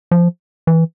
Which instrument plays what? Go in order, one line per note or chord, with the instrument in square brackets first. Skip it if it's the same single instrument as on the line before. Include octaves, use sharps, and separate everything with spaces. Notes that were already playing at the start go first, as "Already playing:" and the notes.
[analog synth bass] F3
E3